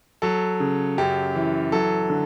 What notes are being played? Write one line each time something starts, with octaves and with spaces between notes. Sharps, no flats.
F#3 A4
C#3
F#2 G4
E3
F#3 A4
D3